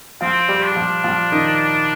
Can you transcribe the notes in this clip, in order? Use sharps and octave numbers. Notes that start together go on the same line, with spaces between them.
F3 C4 F4
G3 G4
D4
G4
F3 F4
F3 F4
D#3 D#4